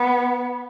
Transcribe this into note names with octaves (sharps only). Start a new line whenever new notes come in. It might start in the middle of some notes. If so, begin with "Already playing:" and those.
Already playing: B3